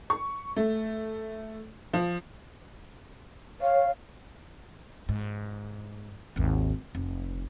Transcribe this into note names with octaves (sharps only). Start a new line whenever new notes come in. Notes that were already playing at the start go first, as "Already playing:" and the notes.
C#6
A3
F3
C#5 F5
G#2
G#1 D#2
F1